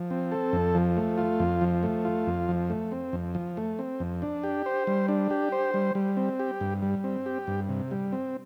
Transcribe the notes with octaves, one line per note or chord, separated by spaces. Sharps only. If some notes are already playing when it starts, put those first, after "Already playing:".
Already playing: F3
C4
A4
F2
F3
A3
F4
F2
F3
A3
F4
F2
F3
A3
C4
F2
F3
A3
C4
F2
D4
G4
C5
G3
D4
G4
C5
G3
G3
C4
G4
G2
G3
C4
G4
G2
C3
G3
C4